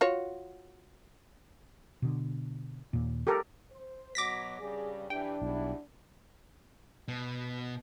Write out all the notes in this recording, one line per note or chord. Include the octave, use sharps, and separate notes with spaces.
F4 F#4 C#5
B2 D3
D#2 A#2
G4 A4 A#4
C5
B2 F#3 D6 A#6 B6
G2 C#3 G3 G#4
E3 D4 G4 G5
B1 E2 G3 E4
B2